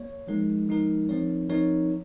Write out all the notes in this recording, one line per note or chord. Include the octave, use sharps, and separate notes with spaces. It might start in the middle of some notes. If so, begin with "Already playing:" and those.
Already playing: A#3 C#5
F3 G#3 D#4 A#4
F3 G#3 D#4 A#4
F3 C4 D#4 A#4 C#5
F3 C4 D#4 A#4 C#5